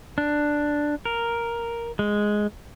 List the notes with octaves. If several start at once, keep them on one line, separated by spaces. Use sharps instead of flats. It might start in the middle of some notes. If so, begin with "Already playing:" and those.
D4
A#4
G#3